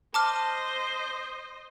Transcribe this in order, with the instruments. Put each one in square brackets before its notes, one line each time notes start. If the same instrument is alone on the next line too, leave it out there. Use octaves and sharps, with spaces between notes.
[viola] C5 D#5 [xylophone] A5 D6 F6